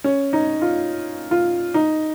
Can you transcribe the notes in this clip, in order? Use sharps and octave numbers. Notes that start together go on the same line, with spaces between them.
C#4
D#4
F4
F4
D#4